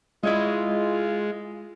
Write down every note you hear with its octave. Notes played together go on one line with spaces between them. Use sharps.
G#3 E4 F4 C#5 D#5